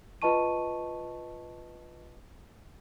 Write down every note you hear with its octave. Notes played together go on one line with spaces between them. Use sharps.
F4 B4 D#5 A5 C#6 D#7